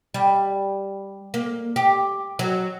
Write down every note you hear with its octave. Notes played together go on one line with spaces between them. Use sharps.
G3
A#3
G4
F#3